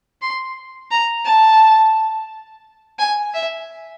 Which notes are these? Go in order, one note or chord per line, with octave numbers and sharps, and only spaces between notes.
C6
A#5
A5
G#5
E5